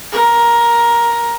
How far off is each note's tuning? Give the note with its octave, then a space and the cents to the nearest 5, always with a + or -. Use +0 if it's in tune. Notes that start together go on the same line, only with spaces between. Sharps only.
A#4 +10